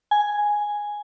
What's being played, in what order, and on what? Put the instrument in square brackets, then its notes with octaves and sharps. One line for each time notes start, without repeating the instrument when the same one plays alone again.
[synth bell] G#5